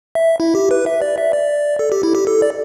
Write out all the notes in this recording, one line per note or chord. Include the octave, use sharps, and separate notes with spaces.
E5
E4
G4
B4
E5
D5
E5
D5
A4
G4
E4
G4
A4
D5